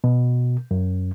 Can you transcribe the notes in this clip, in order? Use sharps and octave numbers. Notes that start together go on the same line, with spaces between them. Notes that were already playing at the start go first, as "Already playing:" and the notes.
B2
F#2